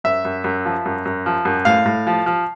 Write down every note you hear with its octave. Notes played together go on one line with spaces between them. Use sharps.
F#2 E5
F#2
F#2
F3
F#2
F#2
F3
F#2
A2 F5
A2
F3
F3